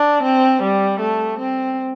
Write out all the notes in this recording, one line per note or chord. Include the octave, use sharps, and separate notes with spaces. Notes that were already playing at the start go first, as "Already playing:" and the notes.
Already playing: D4
C4
G3
A3
C4